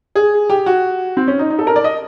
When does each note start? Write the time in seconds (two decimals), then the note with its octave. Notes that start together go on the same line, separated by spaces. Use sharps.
0.16 G#4
0.50 G4
0.66 F#4
1.17 C4
1.28 C#4
1.39 D#4
1.50 D#4
1.59 A4
1.67 A#4
1.76 D5
1.84 D#5